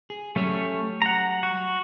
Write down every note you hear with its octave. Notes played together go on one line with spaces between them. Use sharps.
G#4
F#3 G3 A3 C#4 C#5
F#5 A#5
F#4